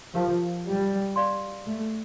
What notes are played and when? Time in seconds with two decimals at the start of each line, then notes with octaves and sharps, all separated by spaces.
0.14 F3 G4 A#4 F5 A5
0.66 G3
1.16 G4 D5 F5 C6
1.67 A3